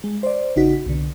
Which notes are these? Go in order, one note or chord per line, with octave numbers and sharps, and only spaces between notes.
G#3
C5 D5
A1 C#3 D#4 F#4 B6
C2 B2 D3